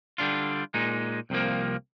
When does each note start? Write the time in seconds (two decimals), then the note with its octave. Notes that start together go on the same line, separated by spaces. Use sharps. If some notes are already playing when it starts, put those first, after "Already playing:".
0.18 D3 G3 D4 F4
0.74 A#2 G#3 D#4
1.30 C2 C3 F3 A#3